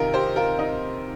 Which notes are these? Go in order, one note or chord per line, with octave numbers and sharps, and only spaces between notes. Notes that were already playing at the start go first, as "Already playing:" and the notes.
Already playing: C3 D#3 D#4 F4 G4 A#4
G4 C5
F4 A#4
D#4